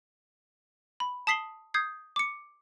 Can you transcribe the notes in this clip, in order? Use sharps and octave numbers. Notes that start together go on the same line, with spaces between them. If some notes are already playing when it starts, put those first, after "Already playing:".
B5
A5 D#6 B6 C7 F#7 G7
D#6 G6 G#6 C7
D6 C#7